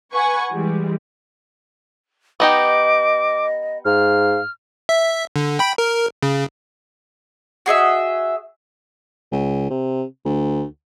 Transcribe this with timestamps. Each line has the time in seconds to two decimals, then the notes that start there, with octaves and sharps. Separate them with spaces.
0.13 B4 F#5 G#5 C#6
0.51 E3 G3 G#3
2.40 B3 D#4 G4 D#5 D6
3.85 G#2 F5 F6
4.89 E5
5.36 D3
5.59 G5 B5
5.78 A#4
6.23 C#3
7.66 F#4 G#4 D#5 E5
9.32 C#2
9.70 C3
10.25 D2